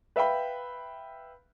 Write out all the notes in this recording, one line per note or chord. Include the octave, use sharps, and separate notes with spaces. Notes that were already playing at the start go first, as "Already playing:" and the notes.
B4 E5 F5 G5 B5